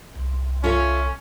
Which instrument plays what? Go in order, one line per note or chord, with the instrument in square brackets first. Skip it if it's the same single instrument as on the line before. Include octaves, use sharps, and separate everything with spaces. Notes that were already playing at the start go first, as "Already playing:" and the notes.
[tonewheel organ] C2
[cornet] C#4 [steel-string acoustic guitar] F4 A4 E5